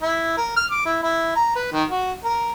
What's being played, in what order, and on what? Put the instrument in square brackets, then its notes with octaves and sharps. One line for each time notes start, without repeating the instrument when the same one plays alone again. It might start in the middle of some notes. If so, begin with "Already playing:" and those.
[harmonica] E4
A#4
F6
D6
E4
E4
A#5
B4
D#3
F#4
A#4